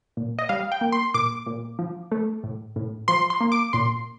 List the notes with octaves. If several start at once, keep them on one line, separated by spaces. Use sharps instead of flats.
A#2
D#5
G3 F5
G5
A#3
C6
A#2 D6
A#2
F3
A3
A2
A2
F3 C6
C6
A#3
D6
A#2 C6